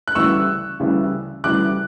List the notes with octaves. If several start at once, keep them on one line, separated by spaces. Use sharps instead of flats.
F#6
D2 C#3 E3 G3 C#6 E6
D2 C#3 E3 G3
D2 C#3 E3 G3 D6 F#6